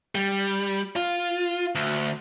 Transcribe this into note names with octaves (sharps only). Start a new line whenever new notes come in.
G3
F4
D2